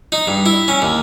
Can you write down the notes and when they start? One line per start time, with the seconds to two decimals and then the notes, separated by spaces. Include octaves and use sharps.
0.12 D#4
0.28 G2
0.46 E4
0.68 C#4
0.82 D#2